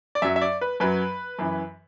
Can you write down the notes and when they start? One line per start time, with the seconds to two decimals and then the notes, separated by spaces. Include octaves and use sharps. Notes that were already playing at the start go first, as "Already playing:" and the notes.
0.15 D5
0.22 F#2 F#3 E5
0.36 E5
0.41 D5
0.61 B4
0.80 F#2 F#3 B4
1.39 F#2 E3